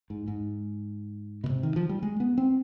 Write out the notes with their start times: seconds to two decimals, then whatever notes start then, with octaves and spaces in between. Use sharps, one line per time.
0.10 G#2
0.28 G#2
1.44 B2
1.50 C3
1.63 D#3
1.76 F3
1.89 G3
2.03 G#3
2.20 B3
2.38 C4